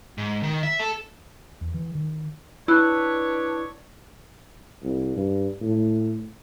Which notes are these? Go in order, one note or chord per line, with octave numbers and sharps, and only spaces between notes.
G#2
D#3
E5
A4
E2
E3
D#3
D4 E4 B4 C#5 E6 F#6
C2
G2
A2